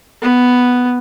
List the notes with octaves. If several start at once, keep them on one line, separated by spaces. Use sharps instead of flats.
B3